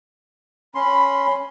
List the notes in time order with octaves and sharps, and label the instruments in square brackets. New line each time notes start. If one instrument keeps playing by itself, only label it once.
[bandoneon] C#4 C6 [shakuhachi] B5